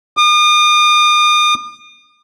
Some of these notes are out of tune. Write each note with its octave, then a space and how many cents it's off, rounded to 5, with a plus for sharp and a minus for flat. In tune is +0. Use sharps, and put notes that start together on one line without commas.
D#6 -45